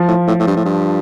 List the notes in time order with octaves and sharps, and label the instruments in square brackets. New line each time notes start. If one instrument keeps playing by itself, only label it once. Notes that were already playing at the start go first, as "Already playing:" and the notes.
Already playing: [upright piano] F3
[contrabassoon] A2
A2
A2
G2
A2
G2